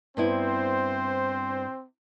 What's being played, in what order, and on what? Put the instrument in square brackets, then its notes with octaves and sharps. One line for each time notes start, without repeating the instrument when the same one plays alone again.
[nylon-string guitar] G2 B3 E4 [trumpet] C4 [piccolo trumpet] C5